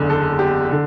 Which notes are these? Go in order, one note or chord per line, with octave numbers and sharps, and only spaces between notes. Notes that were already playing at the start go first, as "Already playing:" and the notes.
Already playing: F#1 E2 D3
A4
G4
D3